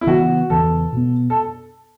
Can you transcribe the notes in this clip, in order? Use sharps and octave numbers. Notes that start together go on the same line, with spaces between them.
E4
C#3 E3 B3 F#4
E2 C#3 E3 A4
B2 B3
A4